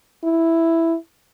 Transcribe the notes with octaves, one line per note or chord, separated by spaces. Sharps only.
E4